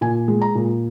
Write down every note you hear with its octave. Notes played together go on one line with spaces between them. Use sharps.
A#2 G#5
G#3
A#5
A#2